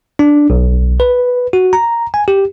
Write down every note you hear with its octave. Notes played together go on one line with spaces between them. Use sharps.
D4
B1
B4
F#4
A#5
G#5
G4